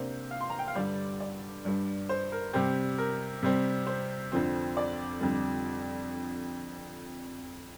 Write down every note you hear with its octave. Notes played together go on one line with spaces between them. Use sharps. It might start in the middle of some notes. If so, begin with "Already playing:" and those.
Already playing: C3 A#3 D4 C5
F5
C6
A#5
G5
F5
G2 D3 G3 D5
D5
G2 G3 D4
C5
A#4
C3 G3 C4 G4
A#4
C3 G3 C4
C5
F2 D3 F3 C4
D5
F2 D3 G3